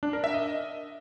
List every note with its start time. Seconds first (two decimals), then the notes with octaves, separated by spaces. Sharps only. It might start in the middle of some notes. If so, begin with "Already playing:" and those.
0.03 D4
0.13 A#4
0.24 E5
0.34 D#5